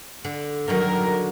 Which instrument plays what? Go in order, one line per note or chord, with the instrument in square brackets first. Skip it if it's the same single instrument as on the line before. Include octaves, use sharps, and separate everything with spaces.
[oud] D3
[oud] D3 D#3 F#3 [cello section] A#4